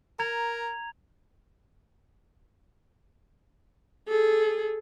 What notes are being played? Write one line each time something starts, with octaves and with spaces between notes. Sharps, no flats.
A#4 A#5 G#6 F7
G#4 A4